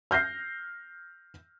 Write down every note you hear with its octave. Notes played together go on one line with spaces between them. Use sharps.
F6 G6 A#6 C7